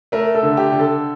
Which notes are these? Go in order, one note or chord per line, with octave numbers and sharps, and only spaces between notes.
A3 A#4
A4
D3
G4
D3
A4